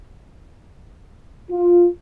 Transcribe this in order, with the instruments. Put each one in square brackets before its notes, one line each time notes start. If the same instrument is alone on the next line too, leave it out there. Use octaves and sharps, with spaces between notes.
[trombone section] F4